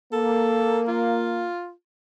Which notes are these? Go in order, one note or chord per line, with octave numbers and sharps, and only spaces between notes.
A#3 A4
F4